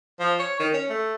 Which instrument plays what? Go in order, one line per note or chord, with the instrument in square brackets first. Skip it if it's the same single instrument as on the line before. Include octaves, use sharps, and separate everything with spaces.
[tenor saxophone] F3
C#5
D#3
C#4
A3